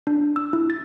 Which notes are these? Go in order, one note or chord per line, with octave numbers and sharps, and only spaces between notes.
D4
E6
E4
A6